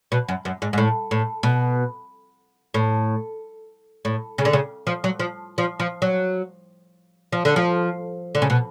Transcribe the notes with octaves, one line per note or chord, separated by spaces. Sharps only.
B2
F#2
F#2
G#2
G#2
A2
A2
B2
A2
A2
C#3
D3
C#3
F3
F#3
F3
F3
F3
F#3
F3
D3
F3
D3
C#3
B2